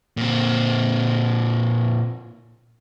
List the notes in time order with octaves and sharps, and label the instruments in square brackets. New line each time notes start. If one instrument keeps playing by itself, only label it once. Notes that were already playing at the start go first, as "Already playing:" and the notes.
[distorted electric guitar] A#2 C4